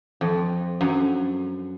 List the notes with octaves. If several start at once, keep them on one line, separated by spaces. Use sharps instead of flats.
F2
F#2